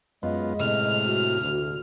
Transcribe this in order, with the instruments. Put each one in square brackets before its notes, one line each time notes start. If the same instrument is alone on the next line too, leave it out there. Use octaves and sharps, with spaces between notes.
[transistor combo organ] F#2 B3 F4 [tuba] G#3 [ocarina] D#5
[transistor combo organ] A2 C3 [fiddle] F6
[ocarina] F#4
[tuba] D2